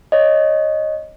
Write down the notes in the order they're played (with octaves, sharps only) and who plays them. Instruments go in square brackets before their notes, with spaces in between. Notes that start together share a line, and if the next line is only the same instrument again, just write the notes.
[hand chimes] C#5 D#5